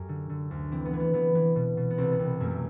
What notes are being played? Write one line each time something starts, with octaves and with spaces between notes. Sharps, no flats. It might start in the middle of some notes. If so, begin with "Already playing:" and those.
Already playing: F#2 G4 A4
D3
D3
D2
E3 C4
B3
E3
B3
E3 B3
E3
B2
B2
B3
C2 C4
B3
C2
F#2 A3
A3